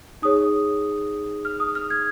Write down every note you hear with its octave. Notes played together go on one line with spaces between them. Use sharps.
D#4 G#4 C#5 D#6
F6
D#6
F6
G#6